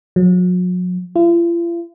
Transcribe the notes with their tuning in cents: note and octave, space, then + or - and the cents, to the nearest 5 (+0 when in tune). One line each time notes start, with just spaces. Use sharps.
F#3 -40
F4 -45